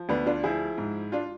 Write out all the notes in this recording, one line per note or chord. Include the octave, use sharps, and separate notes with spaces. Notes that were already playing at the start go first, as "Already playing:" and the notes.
Already playing: F3
D2 B3 D4
D4 F4
F3 E4 G#4
G#2
D4 F4